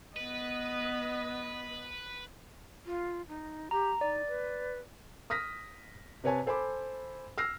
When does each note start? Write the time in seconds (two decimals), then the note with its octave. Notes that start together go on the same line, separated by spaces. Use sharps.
0.16 B3 B4 D#5
2.85 F4
3.28 D#4
3.71 G4 A#5
4.01 D#4 D5
4.28 B4
5.30 D#6 F6 A#6 B6
6.24 C3 B4 C#5 G#5 A5
6.46 A4 C5 G#5 B5 D6
7.38 E6 F6 A#6 C7